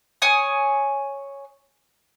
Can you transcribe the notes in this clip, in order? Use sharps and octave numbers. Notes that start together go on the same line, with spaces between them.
C#5 G#5 D#6